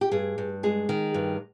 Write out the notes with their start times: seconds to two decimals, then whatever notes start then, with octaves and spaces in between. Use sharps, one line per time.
0.01 G4
0.11 G2 G#4
0.38 G2
0.63 G#3 G#4
0.89 D#3
1.14 G2